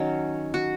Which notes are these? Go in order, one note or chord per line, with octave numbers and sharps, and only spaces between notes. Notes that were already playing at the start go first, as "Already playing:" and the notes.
Already playing: D#3 F#3 C#4
F#4